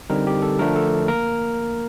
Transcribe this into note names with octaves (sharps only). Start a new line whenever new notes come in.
D3 G3 C4 D#4 A#4
G4
A4
D3 F3 A3 D4 A#4
A4
A#3 A#4